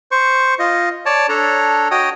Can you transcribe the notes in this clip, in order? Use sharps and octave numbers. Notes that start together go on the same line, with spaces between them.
C5 C#6
F4 D#5
C#5 D5 A5
D4 A4 C#5 A#5
F#4 C#5 D#5 G5 D#6